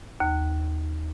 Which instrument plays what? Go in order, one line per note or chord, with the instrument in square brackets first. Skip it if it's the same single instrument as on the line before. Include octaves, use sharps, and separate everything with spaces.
[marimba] D#2